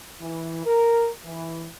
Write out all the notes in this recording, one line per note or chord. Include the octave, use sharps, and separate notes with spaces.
E3
A#4
E3